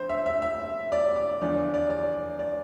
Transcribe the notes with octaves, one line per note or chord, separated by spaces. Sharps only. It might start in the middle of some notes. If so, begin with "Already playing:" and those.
Already playing: F2 D3 C5
E5
E5
E5
D5
D5
E2 D3 F3 D5
D5
D5
D5